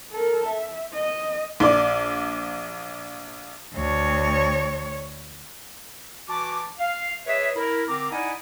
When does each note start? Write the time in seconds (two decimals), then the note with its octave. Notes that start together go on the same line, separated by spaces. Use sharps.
0.12 A4 A#4
0.47 E5
0.94 D#5
1.60 A#1 D5
3.75 D2 C#5
6.29 E3 F#4 A5 D6
6.79 F5
7.27 G#4 B4 C#5 D#5 E5
7.56 E4 A#4
7.88 D3 C4 A#4 A#5 D6
8.11 D#4 E4 D5 D#5 F#5 G#5